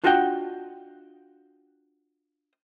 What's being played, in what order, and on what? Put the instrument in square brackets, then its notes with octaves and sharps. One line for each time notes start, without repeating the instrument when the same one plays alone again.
[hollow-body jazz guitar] D4 F4 F#4 D#5 F#5 G5